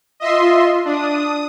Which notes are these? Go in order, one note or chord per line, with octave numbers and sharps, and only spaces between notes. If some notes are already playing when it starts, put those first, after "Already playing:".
F4 D#5 E5 C6
D4 D#6